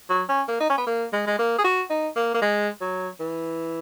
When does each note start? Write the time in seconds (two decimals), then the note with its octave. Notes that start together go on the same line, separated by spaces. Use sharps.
0.10 F#3
0.29 C#4
0.48 A#3
0.60 D#4
0.70 C#4
0.78 B3
0.87 A#3
1.13 G#3
1.27 G#3
1.39 A#3
1.58 G#4
1.64 F#4
1.90 D#4
2.16 A#3
2.35 A#3
2.42 G#3
2.81 F#3
3.20 E3